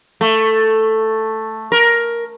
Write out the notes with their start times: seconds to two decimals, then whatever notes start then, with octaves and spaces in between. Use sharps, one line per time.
0.21 A3
1.72 A#4